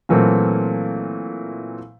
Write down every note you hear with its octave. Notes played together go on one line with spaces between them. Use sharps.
A#2 E3 F#3 A3 A#3 C4